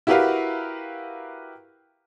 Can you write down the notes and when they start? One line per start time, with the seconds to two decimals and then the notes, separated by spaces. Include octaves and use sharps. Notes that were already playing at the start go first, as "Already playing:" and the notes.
0.07 E4 F#4 G4 A#4 B4 F5